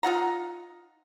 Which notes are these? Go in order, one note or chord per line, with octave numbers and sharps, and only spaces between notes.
D#4 F4 F#5 A#5